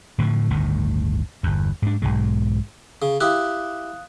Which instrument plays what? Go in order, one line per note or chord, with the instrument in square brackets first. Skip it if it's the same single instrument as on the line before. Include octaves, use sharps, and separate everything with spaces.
[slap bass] A2 D3 E3 F3
G1 D2 A2 D#3
G1 E2
G#2 D4
B1 E2 G#2 G#3
[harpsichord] C#3
[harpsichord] E4 G4 [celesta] F5 D#6 F#6